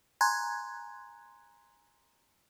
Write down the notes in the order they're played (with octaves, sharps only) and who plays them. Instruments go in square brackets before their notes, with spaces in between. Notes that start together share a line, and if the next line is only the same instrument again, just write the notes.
[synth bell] G#5 A#5 C6 F#6 G#6